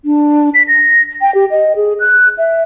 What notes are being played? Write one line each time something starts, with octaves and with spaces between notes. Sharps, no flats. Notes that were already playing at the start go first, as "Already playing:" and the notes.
D4
B6
A#6
G5
G4
D#5
G#4
F#6
E5